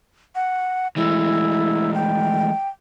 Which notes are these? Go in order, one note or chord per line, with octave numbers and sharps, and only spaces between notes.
F#5
E3 G#3 A3 E4
G5